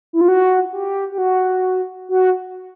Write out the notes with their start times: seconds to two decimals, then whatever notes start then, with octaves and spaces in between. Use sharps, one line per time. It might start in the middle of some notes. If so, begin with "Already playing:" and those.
0.13 E4
0.21 F4
0.28 F#4
0.73 G4
1.12 G4
1.18 F#4
2.09 F#4